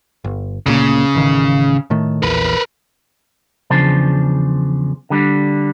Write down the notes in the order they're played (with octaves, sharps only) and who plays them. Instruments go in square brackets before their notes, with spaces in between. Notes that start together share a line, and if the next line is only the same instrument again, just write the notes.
[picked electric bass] G1
[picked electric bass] D2 A#2 A#3 [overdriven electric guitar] C#3
[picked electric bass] A1 D#3
A2 D#3 A3
[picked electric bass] A#1 E2 [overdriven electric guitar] A#4 B4
[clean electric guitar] E2 C#3 F3 D4 C5 A5
D3 G3 D4